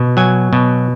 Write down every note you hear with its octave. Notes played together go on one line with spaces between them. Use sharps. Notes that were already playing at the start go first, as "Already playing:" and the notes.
Already playing: B2
F#3 G#5
B2